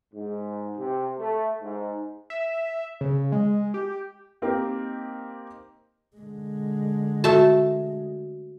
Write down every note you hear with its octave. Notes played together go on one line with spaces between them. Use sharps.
G#2
C3
A3
G#2
E5
C#3
G#3
G4
A#3 C4 D#4 G4 A#4
D3 G#3
A3 F#4 A5